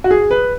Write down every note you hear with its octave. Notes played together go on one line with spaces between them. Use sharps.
F#4
G#4
B4